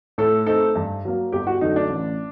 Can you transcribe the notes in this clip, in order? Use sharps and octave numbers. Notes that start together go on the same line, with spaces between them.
A2 A4
A3 C4 D#4 A4
G2
F#3 A#3
G1 G4
F#4
F#2 D3 F#3 A3 D#4
D4
A1